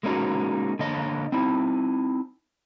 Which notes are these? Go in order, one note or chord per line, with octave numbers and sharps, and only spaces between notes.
G#3 A#3 C#4 D#4 F#4
D3 A#3 C#5 D#5
C4 D#4 E4